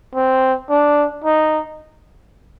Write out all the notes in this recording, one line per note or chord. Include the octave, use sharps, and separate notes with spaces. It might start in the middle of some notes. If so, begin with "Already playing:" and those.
C4
D4
D#4